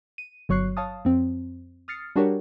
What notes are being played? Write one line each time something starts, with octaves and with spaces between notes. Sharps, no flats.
D#7
G1 F#3 C#5 C#6 F#6 C7
C#5 F5 A5 D#6
F2 C4
D#6 F6 A6 C7 C#7
G3 D4 F#4 G4 A#4 C#5